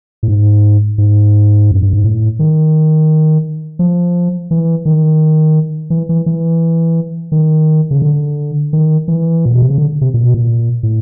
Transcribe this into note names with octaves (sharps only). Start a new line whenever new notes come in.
A2
G#2
G#2
F#2
G2
G#2
A2
D#3
F3
E3
D#3
E3
E3
E3
D#3
C#3
D3
D#3
E3
A#2
B2
C3
C#3
D3
C3
A#2
B2
A#2
A2